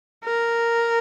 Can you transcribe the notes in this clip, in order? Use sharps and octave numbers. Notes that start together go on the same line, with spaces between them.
A#4